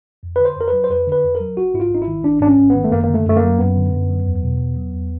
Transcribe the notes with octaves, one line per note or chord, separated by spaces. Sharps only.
F2
D3 B4
C5
F2 A#4
F#3 B4
C5
F2 B4
D3 B4
F2
A#4
F#3
G#1 F#4
G#2 E4
F4
G#1 D#4
E4
D#3
G#1 D4
G#2 D4
C#4
G#1
B3
D#3
A3
F#2 A#3
D3 A#3
A3
F#2 A3
A#3
F#3
F#2 B3
D3
F#2
F#3
E2
B2
E2
F#3
E2